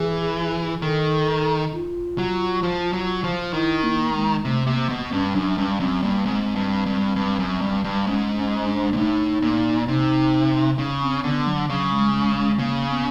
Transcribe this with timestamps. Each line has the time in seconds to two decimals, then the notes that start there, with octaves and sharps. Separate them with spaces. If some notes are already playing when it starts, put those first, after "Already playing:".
Already playing: E3 G#4
0.82 D#3 A4
1.73 F4
2.18 F#3
2.63 F3
2.93 F#3
3.24 F3
3.53 D#3 E4
3.83 A#3
4.14 G#3
4.45 C3 A3
4.67 C3 A#3
4.89 B2 B3
5.12 G2 C#4
5.35 F#2 D4
5.58 G2 C#4
5.80 F#2 C4
6.03 G2 A#3
6.26 G#2 C4
6.56 G2
6.86 G2
7.16 G2
7.39 F#2
7.61 G2
7.84 G2
8.07 G#2 C#4
8.37 C#4
8.67 D4
8.93 A#2
8.97 A2 D#4
9.42 A#2
9.88 C3 D#4
10.79 C#3
11.02 C4
11.23 D3 B3
11.47 F#3
11.69 C#3 F#3
11.92 G#3
12.14 G#3
12.37 G#3
12.59 C#3 A#3
12.90 B3